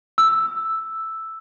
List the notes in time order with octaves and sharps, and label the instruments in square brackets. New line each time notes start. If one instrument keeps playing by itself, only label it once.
[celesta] E6